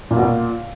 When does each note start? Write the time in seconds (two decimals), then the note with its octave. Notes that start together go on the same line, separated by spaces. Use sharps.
0.11 A#2
0.17 B2
0.22 A#2